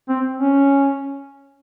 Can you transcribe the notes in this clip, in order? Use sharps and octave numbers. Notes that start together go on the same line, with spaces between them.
C4
C#4